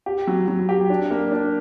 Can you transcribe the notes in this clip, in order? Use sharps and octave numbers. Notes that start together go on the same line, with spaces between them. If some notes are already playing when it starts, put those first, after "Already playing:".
G4
F#3
F#3
G4
D4
A#3
D4